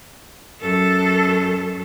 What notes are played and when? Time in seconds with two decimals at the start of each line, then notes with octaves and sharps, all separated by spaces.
0.61 F#2 A4